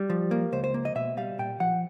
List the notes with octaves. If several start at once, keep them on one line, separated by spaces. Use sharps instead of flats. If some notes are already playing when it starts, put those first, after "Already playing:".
Already playing: G3
F3
A#3
C#2 C5
C5
A#3
D#5
B2 E5
G3 F5
A#2 G5
F3 F#5